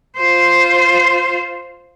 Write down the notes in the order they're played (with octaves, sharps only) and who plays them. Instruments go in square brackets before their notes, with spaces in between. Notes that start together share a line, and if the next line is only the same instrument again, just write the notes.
[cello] F4 C5